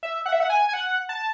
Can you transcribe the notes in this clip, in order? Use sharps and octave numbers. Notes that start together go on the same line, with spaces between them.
E5
F#5
E5
F#5
G#5
G#5
F#5
A5